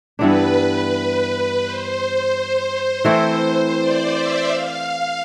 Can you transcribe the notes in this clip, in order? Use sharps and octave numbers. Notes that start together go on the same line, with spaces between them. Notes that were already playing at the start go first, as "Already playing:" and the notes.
G2 E3 B3 D4 B4
C5
E3 A3 C4 E4
D5
E5
F5